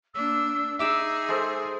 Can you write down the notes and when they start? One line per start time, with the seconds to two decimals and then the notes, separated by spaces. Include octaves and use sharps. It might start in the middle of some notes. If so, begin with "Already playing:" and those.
0.14 A#3 D4 E6
0.79 D#4 G#4 E5 D6 E6
1.28 G#3 A4 C5